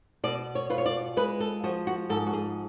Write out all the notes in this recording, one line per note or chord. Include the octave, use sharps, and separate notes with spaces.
B2 D5
C#5
F4 B4
C#5
D5
G#3 B4
A4
F3 F#4
F#4
G#2 A4
F#4
G#4